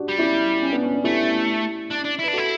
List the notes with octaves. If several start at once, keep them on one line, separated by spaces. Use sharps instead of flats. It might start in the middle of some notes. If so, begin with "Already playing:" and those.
Already playing: D4 F#4 G4
G3
C#4 E4
C#4
B3 D4
C#4
B3 D4
A3 E4 G4
D4
D4
E4
B4
D4
E4 F#4 A4